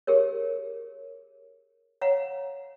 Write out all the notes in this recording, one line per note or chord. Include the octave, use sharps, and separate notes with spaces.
G4 G#4 A#4 C#5
C#5 F5 F#5 A#5